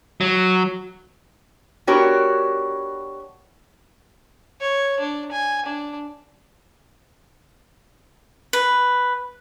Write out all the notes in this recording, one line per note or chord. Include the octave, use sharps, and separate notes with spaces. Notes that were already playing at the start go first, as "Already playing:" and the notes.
F#3
B3 D4 F#4 G4 A#4 C#5
C#5
D4
G#5
D4
B4